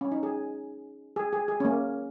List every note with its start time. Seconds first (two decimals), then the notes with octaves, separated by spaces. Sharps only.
0.01 C#4
0.12 D#4
0.23 G#4
1.16 G#4
1.33 G#4
1.48 G#4
1.60 C#4
1.65 A#3